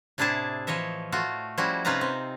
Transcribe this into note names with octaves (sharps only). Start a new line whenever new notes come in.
A2 C3 D4 E4 G#4 A5
E3 F3 C#5 D#5 E5
A3 F4 F#4
F3 G3 C#4 E4 F#4
C3 C#4 D#4 F4 B4 A#5
C4